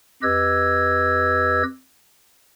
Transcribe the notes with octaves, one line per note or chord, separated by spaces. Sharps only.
F2 G4 B4 D#5 E6 G#6